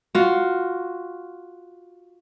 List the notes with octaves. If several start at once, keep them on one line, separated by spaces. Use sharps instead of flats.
F4 F#4